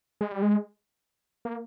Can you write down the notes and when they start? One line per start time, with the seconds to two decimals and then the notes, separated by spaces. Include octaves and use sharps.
0.21 G#3
0.32 G3
0.42 G#3
1.45 A#3